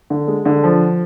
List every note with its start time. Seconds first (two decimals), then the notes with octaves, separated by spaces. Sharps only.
0.10 D3
0.28 G#3
0.45 D3
0.64 F3